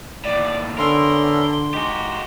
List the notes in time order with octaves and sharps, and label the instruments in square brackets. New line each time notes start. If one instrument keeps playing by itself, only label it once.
[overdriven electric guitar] D#2 A2 [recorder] D5
[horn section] D3 [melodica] B3 C#4 E5 [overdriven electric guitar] A#4 [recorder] C6
[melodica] G#3 D#4 [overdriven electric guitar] F#4 G4